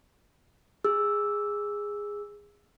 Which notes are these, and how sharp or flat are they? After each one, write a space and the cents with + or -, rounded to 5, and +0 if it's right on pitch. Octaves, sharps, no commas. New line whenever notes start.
G#4 -10 E6 +0